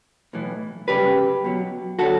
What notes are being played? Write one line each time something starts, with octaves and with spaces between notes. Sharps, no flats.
B1 A2 E3
F#2 C#3 G3 G4 B4
B1 B2 F#3
D3 F#3 F#4 A4